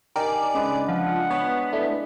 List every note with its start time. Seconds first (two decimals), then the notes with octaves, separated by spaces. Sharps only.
0.16 D#3 G4 A#4 D5 G#5 A5
0.55 C#3 G#3 D4 B4
0.88 F3 F#5
1.31 B3 C#5
1.73 A3 D4 E4